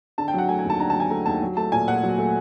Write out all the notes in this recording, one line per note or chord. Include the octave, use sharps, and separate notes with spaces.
D3 A5
G5
F#3 F#5
A3 G#5
G#5
D#2
A5
D3 A#5
A5
F#3 G#5
A3 A#5
D#2 A5
F#3
A3 A5
A#2 G#5
A#2 F#5
F#3
A3